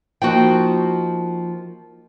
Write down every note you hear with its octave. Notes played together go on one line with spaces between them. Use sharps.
F3 A#3 D#4 F#4 G5